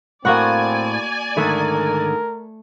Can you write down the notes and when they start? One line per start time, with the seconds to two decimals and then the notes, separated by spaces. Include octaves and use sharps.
0.25 A2 A#3 C4 F#4 D5 F#5 G#5
1.37 G#2 D3 D#3 A3 A#4